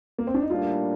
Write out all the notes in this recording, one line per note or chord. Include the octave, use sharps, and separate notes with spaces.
A#3
C4
D4
D#4
A2 G3 A#3 D4 F4